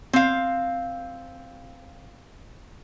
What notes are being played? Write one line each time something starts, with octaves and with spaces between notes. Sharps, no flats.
C4 F5